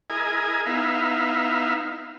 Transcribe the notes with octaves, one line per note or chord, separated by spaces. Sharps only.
E4 G#4 A#4 D#5 G#5
B3 D#4 E4 E5 F5